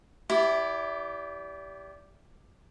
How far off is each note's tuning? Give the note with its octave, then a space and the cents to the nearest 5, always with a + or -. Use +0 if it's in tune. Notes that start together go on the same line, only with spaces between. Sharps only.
E4 +0 G4 +0 D5 -30